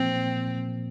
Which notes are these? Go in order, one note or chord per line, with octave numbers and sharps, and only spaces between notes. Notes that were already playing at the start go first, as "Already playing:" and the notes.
Already playing: A#2 F3 A#3 C4